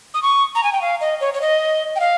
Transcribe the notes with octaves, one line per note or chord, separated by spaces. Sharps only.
D#6
C#6
A#5
G#5
G5
F5
D#5
C#5
C#5
D#5
G5
F5